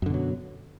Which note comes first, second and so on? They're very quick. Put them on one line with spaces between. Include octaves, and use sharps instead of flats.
F#2 D3 B2 F#3